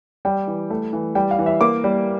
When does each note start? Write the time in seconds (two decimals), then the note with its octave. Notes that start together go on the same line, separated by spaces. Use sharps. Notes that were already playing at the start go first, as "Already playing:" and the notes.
0.25 G3 G5
0.47 E3
0.70 A3
0.93 E3
1.15 G3 G5
1.31 F5
1.39 E3
1.46 E5
1.61 A#3 D6
1.84 G3